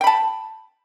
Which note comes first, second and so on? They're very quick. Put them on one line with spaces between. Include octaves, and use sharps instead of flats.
G5 B5 A5